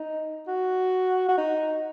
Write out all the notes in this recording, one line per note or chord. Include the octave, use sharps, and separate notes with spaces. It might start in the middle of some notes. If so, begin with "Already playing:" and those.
Already playing: D#4
F#4
F#4
D#4